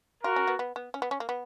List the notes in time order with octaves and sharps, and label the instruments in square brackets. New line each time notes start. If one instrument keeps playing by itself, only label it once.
[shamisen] F4 [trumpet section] F#4 A#4
[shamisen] C#4
B3
B3
B3
C#4
B3
C#4
A#3
B3